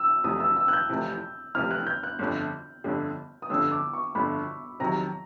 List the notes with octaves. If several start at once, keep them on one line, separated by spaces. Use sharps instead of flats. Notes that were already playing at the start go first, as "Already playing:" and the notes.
Already playing: E6
F1 F2 C3 E3 D#6
E6
E6
F#6
G6
F1 F2 C3 E3
F1 F2 C3 E3 F6
F#6
G6
F#6
G1 F2 D3
G1 F2 D3
D#6
G1 F2 D3 E6
D6
C#6
G1 F2 D3 B5
F2 C3 D#3 F#3 A#5